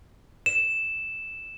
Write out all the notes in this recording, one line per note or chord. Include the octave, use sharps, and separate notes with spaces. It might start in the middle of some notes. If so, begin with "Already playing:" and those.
E7